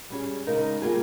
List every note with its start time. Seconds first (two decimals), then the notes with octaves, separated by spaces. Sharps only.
0.10 G3 C#4 G#4
0.46 C#3 G#3 D#4 A#4
0.82 G3 A#3 F4 G#4